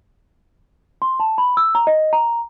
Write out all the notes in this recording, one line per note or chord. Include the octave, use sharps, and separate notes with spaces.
C6
A5
B5
E6
A#5
D#5
A#5